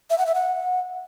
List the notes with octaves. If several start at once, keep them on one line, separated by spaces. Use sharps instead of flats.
E5
F#5
E5
F#5